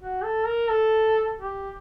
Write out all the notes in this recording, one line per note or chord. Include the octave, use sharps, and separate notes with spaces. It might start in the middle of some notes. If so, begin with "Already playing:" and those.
F#4
A4
A#4
A4
G4